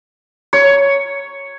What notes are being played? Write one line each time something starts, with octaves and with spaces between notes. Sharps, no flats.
C#5